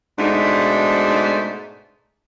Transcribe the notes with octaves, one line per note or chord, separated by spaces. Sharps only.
G#2 B2 A3 D4 D#4